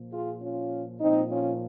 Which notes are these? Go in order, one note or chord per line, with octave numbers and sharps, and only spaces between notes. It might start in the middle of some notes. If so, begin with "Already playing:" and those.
Already playing: A#2 F3
F4 G#4
C#4 F4
A#2 F3 C4 D#4
C#4 F4